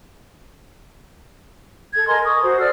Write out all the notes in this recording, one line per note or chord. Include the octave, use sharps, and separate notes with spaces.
A4 G#6
A#4 D#5 G#5 C6
C#6 D#6
F#4 C5
A4 D5 E6 F6